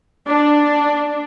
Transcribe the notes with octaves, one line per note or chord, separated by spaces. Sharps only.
D4